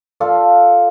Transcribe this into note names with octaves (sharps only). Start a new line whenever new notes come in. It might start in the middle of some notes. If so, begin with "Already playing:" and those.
F4 A4 D5